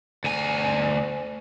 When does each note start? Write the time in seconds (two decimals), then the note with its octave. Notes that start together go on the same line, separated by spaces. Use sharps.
0.24 D2 G#5